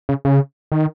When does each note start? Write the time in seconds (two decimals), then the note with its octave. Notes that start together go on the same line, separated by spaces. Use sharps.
0.09 C#3
0.25 C#3
0.72 D#3